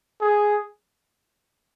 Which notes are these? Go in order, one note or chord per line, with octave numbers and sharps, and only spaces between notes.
G#4